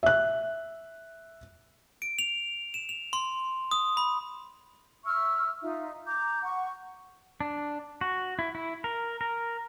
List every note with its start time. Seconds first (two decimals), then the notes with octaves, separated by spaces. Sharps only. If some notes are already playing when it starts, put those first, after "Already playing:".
0.03 E5 F#6
2.02 D7
2.19 F7
2.74 E7
2.89 F7
3.13 C6
3.71 D#6
3.97 B5
5.05 E5 C#6 E6 F6
5.62 D#4 F4 E5
6.06 A#5 D6 G6
6.43 F#5 C#6
7.41 D4
8.01 F#4
8.39 E4
8.55 E4
8.84 A#4
9.21 A#4